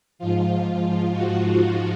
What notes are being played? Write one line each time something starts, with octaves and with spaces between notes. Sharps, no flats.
G#2 F3 F4
F#4
F4